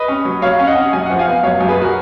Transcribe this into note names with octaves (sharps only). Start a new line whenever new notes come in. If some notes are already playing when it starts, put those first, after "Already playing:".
Already playing: B4 D#5
C#4
F#3
F#3 C#5 F5
C#4
D#5 F#5
C#4
F#2 G#5
F3 F#5
F5 G#5
B3
F#2 C#5 F5
F#2
G#4 B4
F#4 A#4